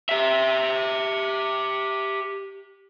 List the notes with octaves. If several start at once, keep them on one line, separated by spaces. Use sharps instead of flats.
G4 E5